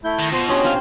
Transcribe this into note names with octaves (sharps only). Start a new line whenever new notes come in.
A3 E4 G6
D#3 A#6
B2 F4 C5
C#4 D4 G4 C#5 C6 D#6
C4 C5 F5 F6